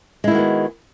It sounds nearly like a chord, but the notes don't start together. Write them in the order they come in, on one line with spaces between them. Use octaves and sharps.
G#3 E4 D#3 F#4 B3